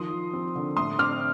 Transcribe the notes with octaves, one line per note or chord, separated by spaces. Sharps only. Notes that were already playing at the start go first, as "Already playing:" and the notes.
Already playing: D#3 F3 C6 D#6
F3
C4
D3
A2 C6 D#6
C4 D6 F6